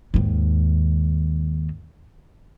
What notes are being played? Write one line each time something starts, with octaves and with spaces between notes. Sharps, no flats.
D#2 G#2